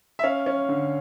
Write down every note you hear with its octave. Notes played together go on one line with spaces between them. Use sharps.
E5
C#4 F5
C#4
D3